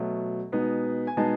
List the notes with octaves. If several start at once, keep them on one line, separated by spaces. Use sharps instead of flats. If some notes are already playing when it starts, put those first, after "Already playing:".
Already playing: B2 F#3 A3
B2 G#3 B3 D#4
G#5
B2 G#3 B3 D#4 A5